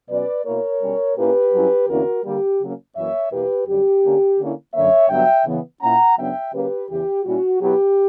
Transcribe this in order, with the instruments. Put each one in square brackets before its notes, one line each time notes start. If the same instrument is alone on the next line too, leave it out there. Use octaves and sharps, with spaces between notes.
[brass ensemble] B2 F#3 C#4 B4 D5
B2 A#3 E4 A#4 C#5
B2 G3 C#4
A#2 A#3 C#4 E4 G4 B4
G2 F#3 C#4 E4
E2 D3 A#3 C#4 E4 F#4 A#4
D3 G3 A#3 G4
C#3 F#3 A#3 C#4
F#2 E3 A#3 C#5 E5
E2 B2 A#3 E4 G4 B4
F#2 D3 G3 G4
D3 A#3 C#4
D3 A#3 C#4 E4
F#2 D3 A#3 C#5 E5
G2 D3 F#3 B3 E5 G5
C#3 E3 B3
A#2 A#3 C#4 E4 F#5 A#5
F#2 C#3 F#3 B3 D4 E5 G5
C#3 F#3 A#3 C#4 G4 B4
E2 C#3 E3 G4
A#2 G3 C#4 E4 F#4
B2 F#3 B3 E4 G4